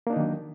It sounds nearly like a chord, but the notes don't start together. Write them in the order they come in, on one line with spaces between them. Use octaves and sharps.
A#3 D4 D#4 D#3 F#3